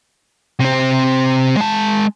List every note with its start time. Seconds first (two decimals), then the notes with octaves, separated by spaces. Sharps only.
0.60 C3 C4
1.57 G#3 A5